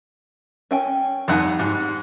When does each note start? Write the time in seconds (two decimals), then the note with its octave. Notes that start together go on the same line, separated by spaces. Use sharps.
0.71 C#4 G5 G#5
1.28 F2 G3 D#4 F#5 G#5
1.59 G#2